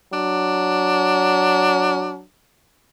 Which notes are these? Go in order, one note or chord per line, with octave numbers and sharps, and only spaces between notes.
F#3 D4